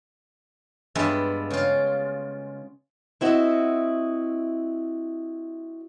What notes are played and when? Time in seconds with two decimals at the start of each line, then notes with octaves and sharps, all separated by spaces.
0.95 G2 G#3 B3 F4 E5 F#5
1.50 C#3 F4
3.21 C4 E4 F#4 D#5